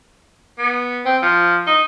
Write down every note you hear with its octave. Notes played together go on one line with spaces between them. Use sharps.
B3
C4
F3
D#4